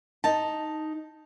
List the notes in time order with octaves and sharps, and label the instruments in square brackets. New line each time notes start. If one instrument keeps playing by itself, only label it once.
[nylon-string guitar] D#4 A5